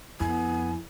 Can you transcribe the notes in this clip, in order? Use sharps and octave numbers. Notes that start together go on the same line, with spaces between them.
F2 B3 E4 G#5